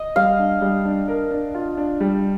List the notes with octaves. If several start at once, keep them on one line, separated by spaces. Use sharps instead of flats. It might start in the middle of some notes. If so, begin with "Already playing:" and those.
Already playing: D#5
G3 F5
D4
G3
D4
A#4
D4
F4
D4
G3